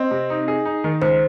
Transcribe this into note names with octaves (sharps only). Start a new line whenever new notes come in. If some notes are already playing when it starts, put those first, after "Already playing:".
Already playing: C4 D#5
C3
D#4
G#4
D#4
D#3
C#2 C5